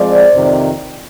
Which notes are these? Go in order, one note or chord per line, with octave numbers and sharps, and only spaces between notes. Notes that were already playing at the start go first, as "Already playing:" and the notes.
Already playing: F3 G#3 C4 C5 D5
F2 C3 D#3